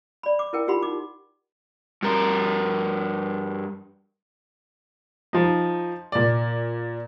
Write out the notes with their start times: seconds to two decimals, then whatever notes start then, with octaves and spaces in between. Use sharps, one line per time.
0.23 D5 B5
0.39 D6
0.53 E4 A#4 G5
0.67 D#4 F4 G4 F#5 B5 C6
0.83 D#4 D6
2.03 G2 A#4
5.33 F3 D#4
6.12 A#2 D5